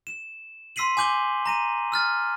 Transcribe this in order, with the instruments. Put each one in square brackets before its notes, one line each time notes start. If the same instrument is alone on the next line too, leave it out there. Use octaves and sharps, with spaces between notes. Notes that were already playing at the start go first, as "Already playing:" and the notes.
[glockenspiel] E7
C6 E6 B6 C7 D#7 F#7
G#5 D6 G6 F#7 G7
A#5 A#6 D#7
E6 F6 A6